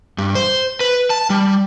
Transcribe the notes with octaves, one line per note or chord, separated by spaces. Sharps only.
G2
C5
B4
A5
G3